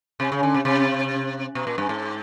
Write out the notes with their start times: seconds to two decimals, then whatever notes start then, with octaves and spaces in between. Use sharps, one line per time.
0.20 C3
0.32 C#3
0.43 D3
0.54 C3
0.65 C3
1.55 B2
1.67 A#2
1.78 G2
1.89 G#2